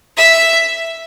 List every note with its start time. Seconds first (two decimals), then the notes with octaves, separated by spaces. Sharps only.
0.17 E5